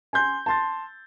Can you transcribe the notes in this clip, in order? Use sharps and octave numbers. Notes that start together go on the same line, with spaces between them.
G#5 C6 G6
A5 C6 A6